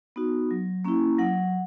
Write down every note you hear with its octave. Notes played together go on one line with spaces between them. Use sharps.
B3 D#4 F#4
F#3
A#3 C#4 E4
F#3 F#5